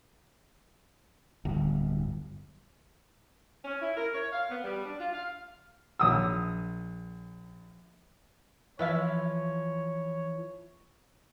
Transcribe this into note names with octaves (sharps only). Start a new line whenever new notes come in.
D1 G1
C#4
E4
A#4
C#5
F5
B3
G3
D4
F4
F5
A#1 D#6 E6
E3 F3 B3 E4 C#5 E5 F5